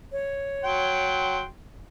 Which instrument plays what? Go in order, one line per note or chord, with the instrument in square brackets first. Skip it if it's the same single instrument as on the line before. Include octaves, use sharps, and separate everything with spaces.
[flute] C#5
[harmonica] F#3 G5 C6